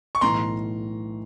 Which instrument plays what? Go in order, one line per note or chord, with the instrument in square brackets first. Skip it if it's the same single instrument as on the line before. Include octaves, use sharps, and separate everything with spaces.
[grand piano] C#6
[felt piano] B1 A2 E3 [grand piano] A#5 C6